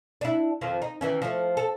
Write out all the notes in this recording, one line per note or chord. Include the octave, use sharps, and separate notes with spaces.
D4 E4
F2 D#3 F3
D#4
D#3 E3 C#4
F3 A3
A4